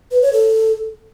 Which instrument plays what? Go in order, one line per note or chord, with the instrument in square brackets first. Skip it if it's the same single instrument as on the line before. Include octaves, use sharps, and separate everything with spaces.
[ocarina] B4
C#5
A4